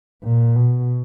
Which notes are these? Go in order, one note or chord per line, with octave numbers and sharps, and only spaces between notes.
A#2
B2